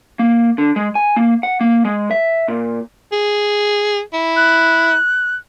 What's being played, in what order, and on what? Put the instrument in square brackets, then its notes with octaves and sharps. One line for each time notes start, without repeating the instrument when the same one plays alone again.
[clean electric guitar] A#3
D3
G#3
G#5
A#3
F#5
A#3
G#3
E5
A#2
[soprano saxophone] G#4
E4
[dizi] F#6